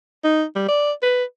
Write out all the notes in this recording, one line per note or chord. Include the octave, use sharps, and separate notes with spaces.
D#4
G3
D5
B4